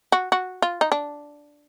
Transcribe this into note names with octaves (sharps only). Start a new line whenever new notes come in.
F#4
F#4
F4
D#4
D4